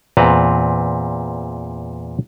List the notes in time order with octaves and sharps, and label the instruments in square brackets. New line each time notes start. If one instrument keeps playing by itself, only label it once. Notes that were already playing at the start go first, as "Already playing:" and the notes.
[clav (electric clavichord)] E2 A#2 C4 B4 A5 A#5